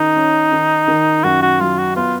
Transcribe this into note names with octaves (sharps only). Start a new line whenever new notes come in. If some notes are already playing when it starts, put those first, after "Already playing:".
Already playing: D#3 C#4 D#4
C#4
D#3
D#3
F#2 F#4
F#4
F#3 F4
F#4
B3 F4